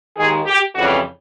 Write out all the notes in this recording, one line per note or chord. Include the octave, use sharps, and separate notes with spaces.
D#2 D#3 G#3 G#4
G4
F2 C#3 E3 G3 F#4